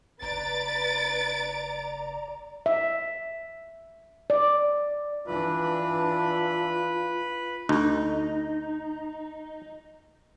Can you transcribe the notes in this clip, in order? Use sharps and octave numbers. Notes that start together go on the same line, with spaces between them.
F#1 B4 D5 A#5 A6 D7
E5
D5
E3 D4 F4 B4
D2 D#4